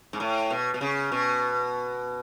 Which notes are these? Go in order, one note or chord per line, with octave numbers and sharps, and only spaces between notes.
G#2
A2
B2
B2
C#3
B2